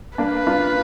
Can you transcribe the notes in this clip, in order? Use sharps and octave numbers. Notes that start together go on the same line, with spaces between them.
A#3 D4 B4
D4 F4